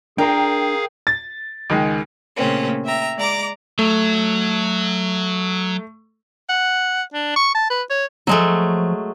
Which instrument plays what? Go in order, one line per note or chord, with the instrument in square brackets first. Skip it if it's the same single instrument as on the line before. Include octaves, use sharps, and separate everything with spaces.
[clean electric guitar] D4 A#5 [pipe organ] G#4 F5 [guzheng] A#4 [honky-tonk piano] G5
[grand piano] A6
[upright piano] C#2 D#3 G#3
[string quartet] A#2 C#3 A3 A#3 C4 C#4
E5 G5 A#5
G#3 D5 A#5 D6
[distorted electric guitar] F#3 [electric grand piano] A3
[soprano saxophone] F#5
D4
C#6
A5
B4
C#5
[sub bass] F3 [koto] F#3 G#3 A3